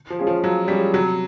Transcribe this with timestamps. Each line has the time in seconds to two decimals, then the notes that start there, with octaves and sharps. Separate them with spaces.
0.10 F3
0.19 G#3 C#4 F4 G#4
0.27 F3
0.44 F3 F#3
0.68 G3 G#3 C#4 F4 G#4
0.94 C3 F#3